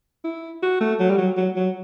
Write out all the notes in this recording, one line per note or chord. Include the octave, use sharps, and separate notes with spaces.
E4
F#4
A3
F#3
G3
F#3
F#3
F#3